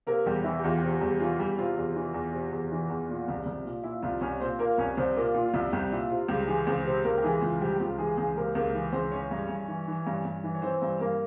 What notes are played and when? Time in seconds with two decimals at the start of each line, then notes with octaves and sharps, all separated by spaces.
0.07 C3 A#3 A#4
0.26 E2 G3 G4
0.44 E3 E4
0.59 G4
0.63 E2 F4
0.77 G4
0.83 C3 F4
1.01 E2 G3 G4
1.20 E3 F4
1.38 E2 G3 G4
1.58 C3 F4
1.77 E2
1.96 E3
2.14 E2
2.33 C3
2.52 E2
2.72 E3
2.90 E2
3.09 A#2
3.28 C2
3.46 C2
3.65 A#2
3.84 A#2 E4
4.02 C2 F4
4.21 C2 C#4 C#5
4.40 A#2 C4 C5
4.59 A#2 A#3 A#4
4.78 C2 C#4 C#5
4.97 C2 C4 C5
5.15 A#2 A#3 A#4
5.34 A#2 F4
5.48 F4
5.54 C2 E4
5.73 C2 G3 G4
5.92 A#2 E4
6.10 C3 F4
6.29 C#2 G3 G4
6.48 E3 G#3 G#4
6.67 C#2 C4 C5
6.85 C3 C4 C5
7.04 C#2 A#3 A#4
7.18 G4
7.23 E3 G#3 G#4
7.42 C#2 F4
7.61 C3 G3 G4
7.76 G4
7.79 C#2 F4
7.98 E3 G#3 G#4
8.17 C#2 G#3 G#4
8.36 C3 A#3 A#4
8.55 C#2 A#3 A#4
8.74 E3
8.93 C#2 C4 C5
9.12 E3 C#4 C#5
9.31 G2
9.49 G2
9.68 E3
9.88 E3
10.07 G2
10.25 G2
10.44 E3
10.55 C#5
10.62 E3 C4 C5
10.82 G2
11.00 G2 A#3 A#4